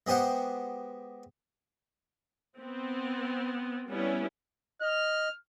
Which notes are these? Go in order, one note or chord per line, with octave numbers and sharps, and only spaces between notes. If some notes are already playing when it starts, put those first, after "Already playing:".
G#3 B3 G4 C5 F#5
B3 C4
G3 B3 C#4 E4
D#5 F6